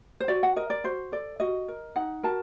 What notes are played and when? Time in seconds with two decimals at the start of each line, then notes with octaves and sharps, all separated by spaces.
0.20 C5
0.28 F#4 D5
0.43 F#5
0.56 A#4 D#5
0.70 D5
0.84 F#4 C5
1.12 A4 D5
1.40 F#4 D#5
1.68 A#4
1.96 D#4 F#5
2.23 F#4 A#4 A5